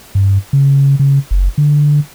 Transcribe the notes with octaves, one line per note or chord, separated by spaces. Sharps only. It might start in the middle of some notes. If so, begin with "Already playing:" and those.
G2
C#3
C#3
F#1
D3